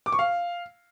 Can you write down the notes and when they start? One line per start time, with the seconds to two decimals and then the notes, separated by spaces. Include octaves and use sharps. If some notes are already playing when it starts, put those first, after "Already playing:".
0.06 D6
0.12 C#6
0.19 F5